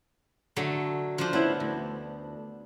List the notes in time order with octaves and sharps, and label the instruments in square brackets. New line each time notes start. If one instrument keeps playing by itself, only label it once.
[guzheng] D3 F#3 A3
F3 D4 C5
[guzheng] B3 [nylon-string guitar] C#4 E4 C5
[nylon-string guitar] D2